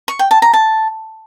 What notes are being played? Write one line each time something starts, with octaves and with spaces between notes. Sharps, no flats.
C#6
G5
A5
A#5
A5